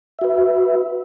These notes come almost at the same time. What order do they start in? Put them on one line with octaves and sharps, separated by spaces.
E5 F#4 B4